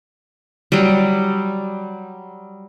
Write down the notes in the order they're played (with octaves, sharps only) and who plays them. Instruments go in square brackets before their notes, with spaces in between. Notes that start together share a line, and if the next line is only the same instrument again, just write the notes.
[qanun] F#3 G3